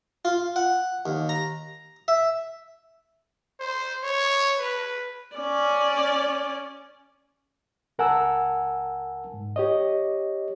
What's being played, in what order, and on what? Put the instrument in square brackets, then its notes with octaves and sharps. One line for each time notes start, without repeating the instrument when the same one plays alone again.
[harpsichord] F4
F#5
D#2
A#5
E5
[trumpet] C5
C#5
B4
[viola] C#4 D5
[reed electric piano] C#2 A#4 F#5 G#5 A5 E6
G#2
G4 C#5 D#5